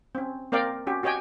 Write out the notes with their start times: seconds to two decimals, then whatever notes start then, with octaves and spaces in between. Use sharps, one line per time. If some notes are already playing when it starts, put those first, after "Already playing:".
0.15 C4 C#4
0.52 A#3 C4 A#4 D5 F5 G5
0.87 C#4 F#4 G4
1.03 F#4 G4 C#5 D#5 G5 G#5